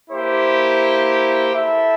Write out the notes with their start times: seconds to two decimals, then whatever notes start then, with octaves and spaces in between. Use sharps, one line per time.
0.10 A#3 E4 G4 C5
1.53 E4 A4 E5